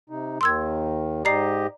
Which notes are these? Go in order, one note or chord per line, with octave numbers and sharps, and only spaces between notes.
C3 D#4
D#2 D#3 C6 E6 G#6
G#2 G4 D5 D#5 A#5 C7